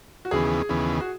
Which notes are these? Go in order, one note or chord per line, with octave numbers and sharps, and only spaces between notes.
F#4
D#2 C#3 E3 B3 G#4
D#2 C#3 E3 B3
F#4